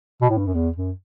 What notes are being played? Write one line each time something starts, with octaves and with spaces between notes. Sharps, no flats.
B2
A2
G2
F#2
E2
F#2